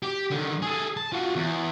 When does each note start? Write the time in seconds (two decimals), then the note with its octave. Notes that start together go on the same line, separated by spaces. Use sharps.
0.03 G4
0.31 D3 D#3
0.62 G#4 A4
0.97 A5
1.13 F4 F#4
1.36 E2